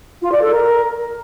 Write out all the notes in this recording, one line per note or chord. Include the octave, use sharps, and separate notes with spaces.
F4
D5
A4
A#4